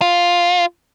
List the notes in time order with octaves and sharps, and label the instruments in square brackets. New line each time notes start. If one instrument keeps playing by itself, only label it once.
[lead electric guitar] F4